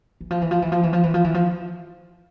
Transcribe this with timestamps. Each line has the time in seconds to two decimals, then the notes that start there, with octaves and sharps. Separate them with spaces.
0.21 E3
0.31 F3
0.41 E3
0.51 F3
0.62 E3
0.72 F3
0.83 E3
0.93 F3
1.03 E3
1.14 F3
1.24 E3
1.34 F3